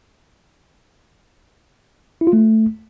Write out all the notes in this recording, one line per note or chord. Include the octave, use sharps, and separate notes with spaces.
E4
F4
A3